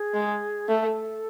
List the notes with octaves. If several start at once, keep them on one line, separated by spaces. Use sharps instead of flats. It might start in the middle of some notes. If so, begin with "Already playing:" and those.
Already playing: G#4
G#3
A3 A4